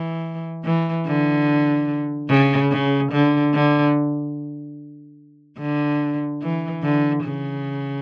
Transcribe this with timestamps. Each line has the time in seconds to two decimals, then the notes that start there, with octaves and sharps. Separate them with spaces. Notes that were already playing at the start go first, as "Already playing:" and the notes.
Already playing: E3
0.65 E3
1.07 D3
2.30 C#3
2.72 C#3
3.12 D3
3.54 D3
5.59 D3
6.42 E3
6.83 D3
7.24 C#3